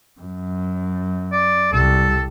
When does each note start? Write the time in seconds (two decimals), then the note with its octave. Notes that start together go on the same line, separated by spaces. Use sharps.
0.21 F#2
1.32 D5
1.73 C2 A4